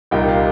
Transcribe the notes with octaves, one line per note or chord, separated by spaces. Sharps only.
C2 A#2 G3 D#4 G5
F5